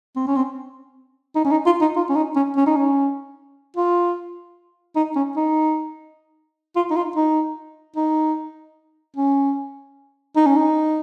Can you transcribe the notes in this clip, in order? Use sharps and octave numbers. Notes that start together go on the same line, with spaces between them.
C4
C#4
C4
D#4
C#4
D#4
F4
D#4
F4
C#4
D#4
C#4
C#4
D#4
C#4
F4
D#4
C#4
D#4
F4
D#4
F4
D#4
D#4
C#4
D#4
C#4
D#4